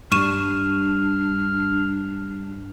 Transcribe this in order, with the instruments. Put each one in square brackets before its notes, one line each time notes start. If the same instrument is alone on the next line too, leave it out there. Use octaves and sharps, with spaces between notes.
[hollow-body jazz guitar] G2 G3 [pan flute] D4 [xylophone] C#6 D#7 E7 [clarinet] F6